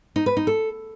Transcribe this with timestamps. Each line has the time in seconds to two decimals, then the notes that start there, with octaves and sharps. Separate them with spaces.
0.16 D#4
0.26 B4
0.37 D#4
0.47 A4